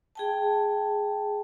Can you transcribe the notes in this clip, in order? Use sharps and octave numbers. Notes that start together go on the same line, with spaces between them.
G#4 G5 A5